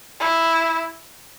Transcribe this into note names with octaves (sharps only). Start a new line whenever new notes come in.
E4